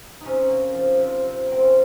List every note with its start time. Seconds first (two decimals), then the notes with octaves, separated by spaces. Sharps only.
0.21 C3 C#4 D#4
0.50 A#3
0.74 F3
0.99 C3
1.23 C3
1.47 A#3 C4
1.61 C#4